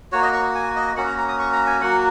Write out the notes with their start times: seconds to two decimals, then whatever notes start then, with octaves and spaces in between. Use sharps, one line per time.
0.12 A#3 F#4 C#5
0.22 D#5
0.33 C#6
0.55 G#5
0.76 D#5
0.96 A#3 C#4 F#4 F#5
1.07 A#5
1.18 A#5
1.28 D#6
1.39 C#6
1.53 A#5
1.67 G#5
1.82 F#3 A#3 F#4 F#5